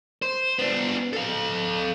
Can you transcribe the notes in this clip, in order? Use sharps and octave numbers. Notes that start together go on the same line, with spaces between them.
C5
B3 D4
A4 F5